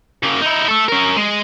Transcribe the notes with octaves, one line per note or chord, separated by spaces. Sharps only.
C#3 A#3
D#4 E4
A4 E5
C#4 A#4
G#3